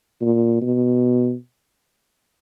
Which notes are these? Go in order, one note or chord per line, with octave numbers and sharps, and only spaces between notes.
A#2
B2